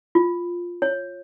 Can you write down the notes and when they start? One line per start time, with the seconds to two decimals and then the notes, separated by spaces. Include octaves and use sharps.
0.15 F4
0.82 C#5